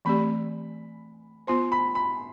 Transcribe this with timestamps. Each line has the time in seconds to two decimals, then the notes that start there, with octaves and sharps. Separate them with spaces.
0.05 E3 A3 C4 G4 D5 B5
1.47 B3 F4 C5 C6
1.72 B5
1.95 B5